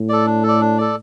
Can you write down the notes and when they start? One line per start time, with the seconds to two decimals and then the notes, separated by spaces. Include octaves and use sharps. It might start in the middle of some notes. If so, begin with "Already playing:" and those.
Already playing: A2
0.09 A4 D5
0.26 D4
0.43 A4 D5
0.61 D4
0.78 A4 D5